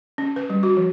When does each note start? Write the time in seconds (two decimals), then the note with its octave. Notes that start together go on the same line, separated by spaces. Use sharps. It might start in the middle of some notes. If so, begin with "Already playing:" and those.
0.18 C#4
0.36 B4
0.50 G3
0.63 F#4
0.77 F3